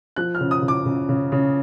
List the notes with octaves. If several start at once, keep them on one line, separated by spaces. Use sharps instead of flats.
F3 F#6
F6
C#3
D#6
C#3
D6
C#3
C#3
C#3